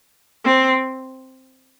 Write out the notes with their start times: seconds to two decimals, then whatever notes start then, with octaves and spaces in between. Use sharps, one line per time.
0.45 C4